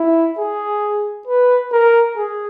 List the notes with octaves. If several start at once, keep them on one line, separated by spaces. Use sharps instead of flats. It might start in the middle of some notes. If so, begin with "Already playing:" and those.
Already playing: E4
G#4
B4
A#4
G#4